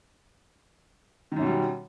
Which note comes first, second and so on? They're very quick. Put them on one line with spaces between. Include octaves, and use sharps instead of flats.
D#3 F#2 B2 G3